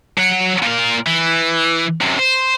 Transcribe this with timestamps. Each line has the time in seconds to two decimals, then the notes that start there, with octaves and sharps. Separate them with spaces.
0.18 F#3 F#5
0.63 A#2 A#4
1.06 E3
2.01 F#2 C3
2.19 C5